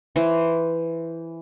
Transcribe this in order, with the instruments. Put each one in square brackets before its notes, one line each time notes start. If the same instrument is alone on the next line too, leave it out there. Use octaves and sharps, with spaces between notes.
[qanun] E3 C5